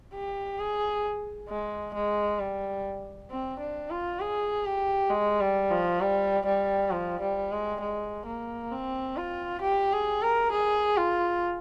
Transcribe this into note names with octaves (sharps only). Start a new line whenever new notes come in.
G4
G#4
G#3
G#3
G3
C4
D4
F4
G#4
G4
G#3
G3
F3
G3
G3
F3
G3
G#3
G#3
A#3
C4
F4
G4
G#4
A#4
G#4
F4